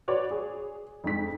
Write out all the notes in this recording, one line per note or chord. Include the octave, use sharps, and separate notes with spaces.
F#4 B4 C#5 D5
G#4
F2 G#2 B6